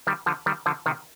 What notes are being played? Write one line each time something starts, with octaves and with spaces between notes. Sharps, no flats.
D#3 G3
D3 F3
D#3 G3
D3 F3
C3 D#3